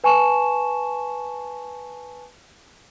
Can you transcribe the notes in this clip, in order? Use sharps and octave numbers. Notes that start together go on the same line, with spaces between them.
B4 G#5 A5 C#6 E7